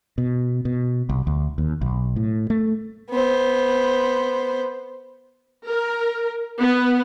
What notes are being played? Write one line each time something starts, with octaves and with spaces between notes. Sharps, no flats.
B2
B2
C2
D2
D#2
B1
A2
A3
B3 C5
A#4
B3